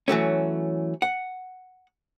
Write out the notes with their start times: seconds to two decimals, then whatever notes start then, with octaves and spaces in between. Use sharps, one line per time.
0.08 E3 F#3 A3 C#4
1.02 F#5